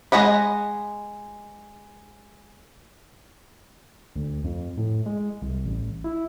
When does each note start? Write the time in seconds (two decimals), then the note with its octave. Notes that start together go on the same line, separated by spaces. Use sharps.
0.12 G#3 D#5 F#5 B5
4.15 D2
4.44 F2
4.77 A2
5.06 G#3
5.42 C2
5.65 A1
6.04 E4